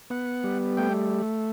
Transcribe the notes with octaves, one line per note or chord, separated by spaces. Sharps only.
B3 F#5
G3
A3 G5